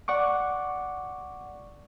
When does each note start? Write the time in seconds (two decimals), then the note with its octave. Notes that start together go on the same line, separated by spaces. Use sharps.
0.08 D5 F#5 C#6 D6